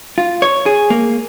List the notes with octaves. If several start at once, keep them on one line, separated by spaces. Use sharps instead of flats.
F4
C#5
G#4
A#3